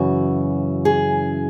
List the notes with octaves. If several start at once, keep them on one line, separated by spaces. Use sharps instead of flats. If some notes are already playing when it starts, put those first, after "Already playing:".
Already playing: F#2 C#3 E3 F#4
G#4